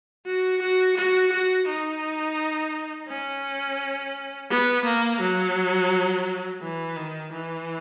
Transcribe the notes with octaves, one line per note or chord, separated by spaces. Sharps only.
F#4
F#4
F#4
F#4
D#4
C#4
B3
A#3
F#3
E3
D#3
E3